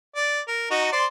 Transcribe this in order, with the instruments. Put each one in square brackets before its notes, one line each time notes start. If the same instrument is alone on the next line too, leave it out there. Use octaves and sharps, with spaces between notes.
[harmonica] D5
A#4
D#4 F#4 A#5
C5 D5 C6